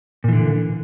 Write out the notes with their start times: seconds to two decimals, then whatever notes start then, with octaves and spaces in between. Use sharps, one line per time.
0.24 A#2
0.28 E3
0.33 D3